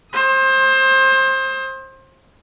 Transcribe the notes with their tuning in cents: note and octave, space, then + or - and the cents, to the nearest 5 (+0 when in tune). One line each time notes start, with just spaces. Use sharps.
C5 +25 D#6 +30